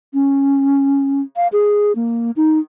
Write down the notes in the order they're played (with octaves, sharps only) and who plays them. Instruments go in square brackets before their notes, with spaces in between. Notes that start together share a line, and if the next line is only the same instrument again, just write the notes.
[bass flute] C#4
F5
G#4
A#3
D#4